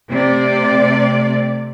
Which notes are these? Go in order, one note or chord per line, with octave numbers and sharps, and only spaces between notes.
C3 A3 D5